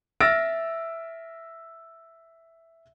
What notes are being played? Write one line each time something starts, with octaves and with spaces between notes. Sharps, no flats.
E5 E6 F6 A6 A#6 D7